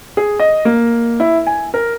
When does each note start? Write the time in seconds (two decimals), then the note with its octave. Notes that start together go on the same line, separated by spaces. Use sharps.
0.17 G#4
0.39 D#5
0.65 A#3
1.20 E4
1.47 G#5
1.74 A#4